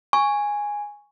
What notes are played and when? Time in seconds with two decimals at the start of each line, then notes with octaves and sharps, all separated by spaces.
0.13 G#5 C#6